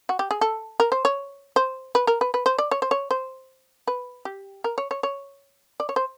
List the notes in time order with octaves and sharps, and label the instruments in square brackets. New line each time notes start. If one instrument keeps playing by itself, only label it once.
[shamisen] F#4
G4
G#4
A4
A#4
C5
C#5
C5
B4
A#4
B4
B4
C5
D5
C#5
C5
C#5
C5
B4
G4
A#4
C#5
C#5
C#5
D5
C#5
C5